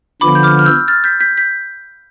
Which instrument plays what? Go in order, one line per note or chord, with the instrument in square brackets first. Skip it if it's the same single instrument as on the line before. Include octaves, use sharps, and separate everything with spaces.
[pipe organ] D3 F3 B3 [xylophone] B5 D6
[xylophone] G6
D6 F6
F6
E6 G6
F6 A6
G6 B6
G6 B6
G6 B6